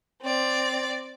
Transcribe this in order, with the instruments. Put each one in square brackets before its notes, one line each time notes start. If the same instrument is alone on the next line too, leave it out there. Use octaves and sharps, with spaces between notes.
[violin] C4 D5